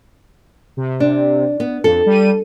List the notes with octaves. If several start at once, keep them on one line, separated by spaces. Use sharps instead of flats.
C3
D4
B3
F2 A4
G3 D#7